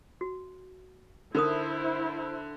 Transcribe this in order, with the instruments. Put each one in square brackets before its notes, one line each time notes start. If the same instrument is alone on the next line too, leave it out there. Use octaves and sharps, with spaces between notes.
[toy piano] F#4
[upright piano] D3 [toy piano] D#4 A#4 D#6 [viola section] E4 C5